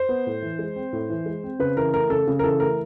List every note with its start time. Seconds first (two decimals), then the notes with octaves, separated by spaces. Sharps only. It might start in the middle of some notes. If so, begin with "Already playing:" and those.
Already playing: C5
0.09 B3
0.27 A2
0.42 E3
0.59 G#3
0.76 C4
0.93 A2
1.10 E3
1.26 G#3
1.43 C4
1.59 C#3 B4
1.77 E3 A#4
1.94 A3 A#4
2.10 C#3 A4
2.27 C#3
2.39 A#4
2.44 E3 A4
2.60 A3 A#4